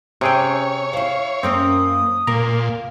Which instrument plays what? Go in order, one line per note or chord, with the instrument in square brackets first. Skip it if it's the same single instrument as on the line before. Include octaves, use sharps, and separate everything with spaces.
[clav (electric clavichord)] C3 G#4 G5 [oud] C4 C#4 [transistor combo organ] C#5
[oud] E4 C5 [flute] F5
[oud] F#2 A#3 C#4 [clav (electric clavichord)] C4 [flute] D#6
[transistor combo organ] A#2 [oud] A#3 [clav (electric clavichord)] A#5